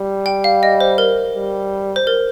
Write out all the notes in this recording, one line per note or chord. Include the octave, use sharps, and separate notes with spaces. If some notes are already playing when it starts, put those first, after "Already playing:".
Already playing: G3
G5
F5
D#5
C5
A#4
G3
C5
A#4